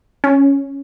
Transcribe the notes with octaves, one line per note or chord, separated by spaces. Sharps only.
C#4